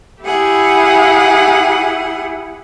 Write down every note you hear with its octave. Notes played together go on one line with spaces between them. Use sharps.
E4 G4 G#4 F#5